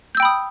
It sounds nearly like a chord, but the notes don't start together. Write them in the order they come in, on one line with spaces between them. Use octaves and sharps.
G6 E6 G5 B5 D#6